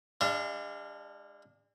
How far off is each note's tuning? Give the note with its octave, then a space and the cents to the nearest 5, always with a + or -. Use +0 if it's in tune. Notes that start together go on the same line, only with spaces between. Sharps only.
G#3 -45 D4 +0 F5 -35